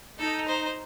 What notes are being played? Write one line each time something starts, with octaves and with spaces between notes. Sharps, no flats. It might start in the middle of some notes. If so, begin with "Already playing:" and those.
D#4 A4
C5